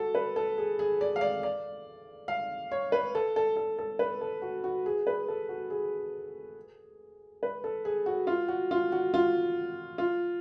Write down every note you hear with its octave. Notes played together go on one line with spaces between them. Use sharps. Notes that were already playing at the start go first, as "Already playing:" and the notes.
Already playing: F#4 A4
B4
A4
G#4
G#4
D5
F5
D5
D5
F5
C#5
B4
A4
A4
A4
A4
B4
A4
F#4
F#4
G#4
B4
A4
F#4
G#4
B4
A4
G#4
F#4
F4
F#4
F4
F#4
F4
F4